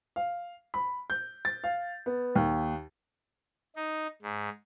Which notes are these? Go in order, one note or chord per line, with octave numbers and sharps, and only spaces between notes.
F5
B5
G6
A6
F5
B3
D#2
D#4
G#2